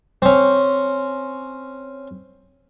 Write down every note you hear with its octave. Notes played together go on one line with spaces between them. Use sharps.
C4 C#4